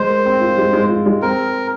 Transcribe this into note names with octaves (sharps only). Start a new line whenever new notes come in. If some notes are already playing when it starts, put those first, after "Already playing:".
Already playing: G#3 C5
A#4
C4
F4
G#3
G#3
F4
G#3
C4 A#4